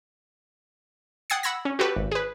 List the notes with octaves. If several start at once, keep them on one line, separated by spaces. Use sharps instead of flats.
F#5 G5 D#6 G#6 A6 C7
F#5 B5 E6 G#6 A#6
C#4
F#4 G4 A4 B4
G#1
G#4 B4